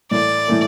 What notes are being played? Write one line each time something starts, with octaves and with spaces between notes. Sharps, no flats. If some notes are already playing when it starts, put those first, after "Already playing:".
A2 E3 A3 D5
A2 E3 A3